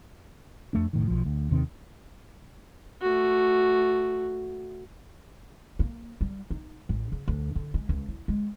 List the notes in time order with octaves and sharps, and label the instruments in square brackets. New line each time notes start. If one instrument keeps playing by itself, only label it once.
[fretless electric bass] F2 A3 D4
F1 A2 D#3
B1 F3
D2
D#2 C3 D#3 C4
[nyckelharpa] A3 F#4
[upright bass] A#3
G3
D#4
A1
C#3
D2
D3
G#3
C#2
E4
G#3